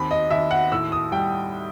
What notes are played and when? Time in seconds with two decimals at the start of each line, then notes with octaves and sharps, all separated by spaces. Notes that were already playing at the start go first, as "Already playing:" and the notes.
Already playing: D#2 C4 B5
0.11 D#5
0.30 D#2 E5
0.51 F#5
0.72 A2 E6
0.92 D#6
1.12 G3 G5